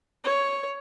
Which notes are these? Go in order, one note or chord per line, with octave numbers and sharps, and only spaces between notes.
C#5